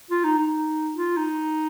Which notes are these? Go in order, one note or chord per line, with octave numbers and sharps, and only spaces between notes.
F4
D#4
D#4
F4
D#4